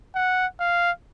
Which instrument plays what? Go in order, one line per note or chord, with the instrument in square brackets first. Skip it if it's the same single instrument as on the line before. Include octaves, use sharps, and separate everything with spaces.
[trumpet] F#5
F5